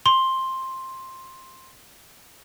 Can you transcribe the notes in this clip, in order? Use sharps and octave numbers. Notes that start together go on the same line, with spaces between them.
C6 G7